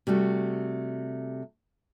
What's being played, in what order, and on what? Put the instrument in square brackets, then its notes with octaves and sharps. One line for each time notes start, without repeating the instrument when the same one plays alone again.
[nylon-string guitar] C3 G3 A3 F#4